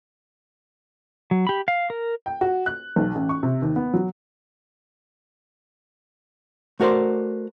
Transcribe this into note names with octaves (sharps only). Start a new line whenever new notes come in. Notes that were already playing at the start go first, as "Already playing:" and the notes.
F#3
G4 B5
F5
A#4
G5
F#4
F#6
B1
A1
C#6
C3
D#2
B3
F#3
A3 F#4 A#4 C5 D5